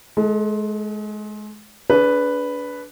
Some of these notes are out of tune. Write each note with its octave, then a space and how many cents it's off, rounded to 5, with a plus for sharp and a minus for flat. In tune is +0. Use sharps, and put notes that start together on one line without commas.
G#3 +30 A4 +0
D4 -30 G#4 +30 B4 +0